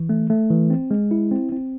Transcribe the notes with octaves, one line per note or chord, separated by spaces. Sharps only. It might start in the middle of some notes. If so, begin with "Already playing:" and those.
Already playing: E3
A3
A3
E3
C4
G#3
E4
C4
C4